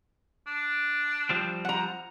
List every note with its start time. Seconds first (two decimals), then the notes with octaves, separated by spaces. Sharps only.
0.47 D4
1.29 F3 G3 C4
1.65 F#5 A#5